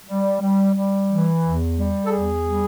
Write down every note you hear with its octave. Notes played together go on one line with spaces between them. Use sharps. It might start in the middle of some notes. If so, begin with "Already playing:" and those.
G3
G3
G3
E3
E2
G3
A4
E2 G#4
G3